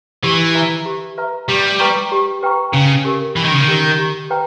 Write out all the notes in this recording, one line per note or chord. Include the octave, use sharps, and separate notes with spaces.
E3 G4
B4 E5 A#5
G4
B4 E5 A#5
G3 G4
B4 G5 A#5 C#6
G4
B4 G5 A#5 C#6
C#3 C#4
G4 A#4
E3 C#4
D#3
C#3
D#3
G4 A#4
G4
B4 G5 A#5